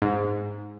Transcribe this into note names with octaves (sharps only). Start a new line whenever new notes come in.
G#2